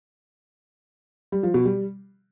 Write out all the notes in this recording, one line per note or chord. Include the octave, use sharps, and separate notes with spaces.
G3
F3
B2
G3